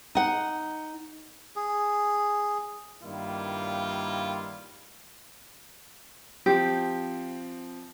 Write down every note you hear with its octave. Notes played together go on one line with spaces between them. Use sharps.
D#4 F#5
G#4
G2 D#3 G3 A#3 E4 F4
F3 C4 G4